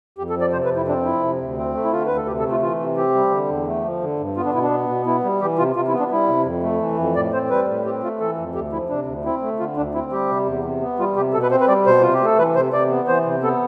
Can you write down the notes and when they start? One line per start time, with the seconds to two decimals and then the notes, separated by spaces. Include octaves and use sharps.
0.18 F2 G4
0.30 A4
0.36 F3
0.41 D5
0.53 C3 C5
0.65 B4
0.71 F2
0.77 E4
0.88 C4 D4
1.05 F3 E4
1.23 C3
1.40 D2
1.58 C4
1.75 A3
1.85 E4
1.92 D3 F4
2.06 D2 B4
2.17 A4
2.27 C3 G4
2.39 A4
2.44 A3
2.51 F4
2.62 E3 F4
2.80 C3
2.97 C4 G4
3.15 G3
3.32 D3
3.49 E2
3.67 A3
3.84 F3
4.02 D3
4.19 G2
4.36 B3 F4
4.46 D4
4.54 B2 E4
4.63 D4
4.71 B3
4.89 B2
5.06 B3 E4
5.24 G3
5.41 E3 G4
5.58 C3 F4
5.76 C3 F4
5.88 E4
5.93 B3
6.00 D4
6.11 G3 E4
6.28 C3
6.45 F2
6.63 A3
6.81 E3
6.98 F2
7.16 A2 D5
7.33 C4 C5
7.50 G3 B4
7.68 A2
7.85 C4 G4
8.03 A3 F4
8.20 E3 A4
8.38 F2
8.55 D2 G4
8.72 F3 E4
8.90 C3 D4
9.07 D2
9.25 C4 E4
9.42 A3
9.59 D3 F4
9.77 D2 D4
9.94 C4 E4
10.12 G3 G4
10.29 C3
10.46 E2
10.64 C3
10.82 B3
10.99 G3 F4
11.16 C3 G4
11.34 B2 A4
11.43 B4
11.51 C4 C5
11.61 B4
11.68 G3 D5
11.86 B2 C5
12.01 C3 F4
12.13 G4
12.21 A3 A4
12.38 E3 B4
12.56 C3 C5
12.73 C3 D5
12.90 B3
13.08 E3 C5
13.26 C3
13.43 B3 A4